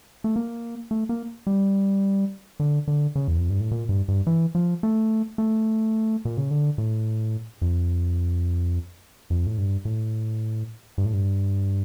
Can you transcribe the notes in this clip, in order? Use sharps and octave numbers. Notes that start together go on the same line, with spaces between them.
A3
A#3
A3
A#3
G3
D3
D3
C#3
E2
F2
G2
A2
A#2
G2
G2
E3
F3
A3
A3
A#2
C#3
D3
A2
F2
F2
A2
G2
A2
G2
A2
G2